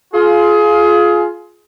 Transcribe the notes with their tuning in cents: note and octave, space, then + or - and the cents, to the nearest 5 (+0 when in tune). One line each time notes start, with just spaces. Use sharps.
F4 +0 G#4 +25